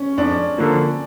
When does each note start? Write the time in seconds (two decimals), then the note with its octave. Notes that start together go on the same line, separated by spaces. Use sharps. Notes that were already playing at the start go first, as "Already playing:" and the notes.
Already playing: C#4
0.17 F2 D4
0.58 D3 F3 A#3